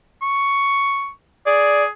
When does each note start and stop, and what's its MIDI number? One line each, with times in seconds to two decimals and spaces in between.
0.22 1.10 85
1.47 1.88 68
1.47 1.84 74